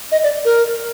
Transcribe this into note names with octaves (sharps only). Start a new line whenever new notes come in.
D#5
D5
A#4